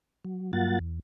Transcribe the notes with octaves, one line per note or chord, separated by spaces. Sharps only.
F#3
G2 F#3 A#3 F4 F#5 A6
E2